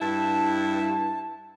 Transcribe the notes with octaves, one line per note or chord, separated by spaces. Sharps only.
G2 E4 A5